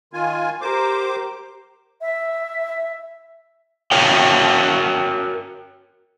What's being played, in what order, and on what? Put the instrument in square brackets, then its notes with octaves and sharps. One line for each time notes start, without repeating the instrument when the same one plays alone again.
[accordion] D#3 F4 G#5
[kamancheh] G4 A#4 [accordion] C5 D6
[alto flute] E5
[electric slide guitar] F#4 A#4 C#5 E5 G5